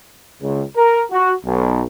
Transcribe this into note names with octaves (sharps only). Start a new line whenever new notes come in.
C#2
A#4
F#4
B1